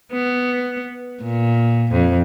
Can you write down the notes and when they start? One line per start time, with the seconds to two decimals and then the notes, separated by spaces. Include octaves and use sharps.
0.12 B3
1.23 A#2
1.91 F2